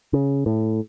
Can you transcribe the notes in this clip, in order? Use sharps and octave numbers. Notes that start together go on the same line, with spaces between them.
C#3
A2